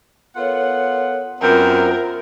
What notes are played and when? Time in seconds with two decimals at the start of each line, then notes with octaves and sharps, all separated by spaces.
0.36 B3 F4 A4 A#4 C#5 F#5
1.41 F#2 B3 C4 F4 A#4 C5 E5